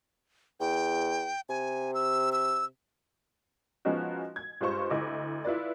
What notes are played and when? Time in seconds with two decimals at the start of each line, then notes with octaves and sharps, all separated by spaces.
0.60 E2 G5
1.49 C3 G#5
1.94 E6
2.32 E6
3.85 F3 G#3 B3 C#4 D#4 F#4
4.36 G#6
4.61 G2 G#3 F4 C5 C#6
4.90 D2 E4 D#5 D6
5.45 E4 F4 B4 D5